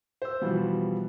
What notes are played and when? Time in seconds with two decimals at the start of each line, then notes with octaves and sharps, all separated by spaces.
0.22 C5 E6
0.42 B2 E3 F3 G3